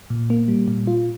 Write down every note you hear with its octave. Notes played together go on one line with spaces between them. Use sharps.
A#2
A#3
G3
A#2
F4